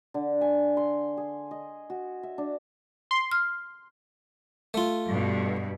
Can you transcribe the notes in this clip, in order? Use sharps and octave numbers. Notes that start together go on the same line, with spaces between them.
D3
G#5
C6
G#4
D#5
F#4
E5
D4
C6
F6
A3 F4
G2 B2